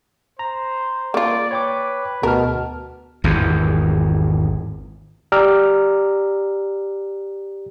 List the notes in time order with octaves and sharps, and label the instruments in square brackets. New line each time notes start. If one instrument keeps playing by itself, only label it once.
[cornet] C5 [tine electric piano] A#5
[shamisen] A#3 F4 [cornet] D5
[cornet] B4 [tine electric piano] C#5 G5 D6
[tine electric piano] D2 A5 F6 [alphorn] B2 [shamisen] A#4
[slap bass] G#1 E2
[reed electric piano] G4 D5 A#5 D6 E6 F6